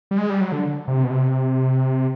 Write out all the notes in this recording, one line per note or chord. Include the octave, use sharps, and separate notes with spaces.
G3
G#3
G3
F#3
D3
C3
B2
C3